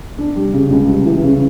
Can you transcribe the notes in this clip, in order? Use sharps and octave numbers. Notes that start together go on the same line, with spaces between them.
D4
G3
C#3
C#2
G3
E3
C#3